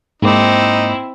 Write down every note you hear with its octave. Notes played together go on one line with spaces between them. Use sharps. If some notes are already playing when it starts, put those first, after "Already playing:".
G#2 A#3 C4 D#4 E4 D6